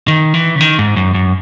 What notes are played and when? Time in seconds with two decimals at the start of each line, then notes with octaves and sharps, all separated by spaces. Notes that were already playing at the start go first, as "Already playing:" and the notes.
0.08 D#3
0.34 E3
0.56 C#3
0.61 D#3
0.79 G#2
0.96 F#2
1.14 F#2